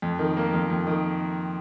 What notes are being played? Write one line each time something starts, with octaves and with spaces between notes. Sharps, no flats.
F2
D#3
A#3
F2
F2
D#3